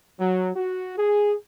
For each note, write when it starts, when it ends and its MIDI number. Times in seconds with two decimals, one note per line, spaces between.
0.20 0.51 54
0.56 0.93 66
0.98 1.34 68